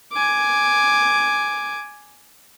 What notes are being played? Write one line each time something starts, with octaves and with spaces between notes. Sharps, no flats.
G#5 D6